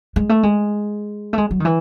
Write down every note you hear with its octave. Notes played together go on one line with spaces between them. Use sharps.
G#3
A3
G#3
A3
G#3
F#3
D#3
E3